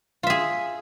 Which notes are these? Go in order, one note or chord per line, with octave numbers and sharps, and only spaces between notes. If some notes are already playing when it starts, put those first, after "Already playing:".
F4 G#4 E5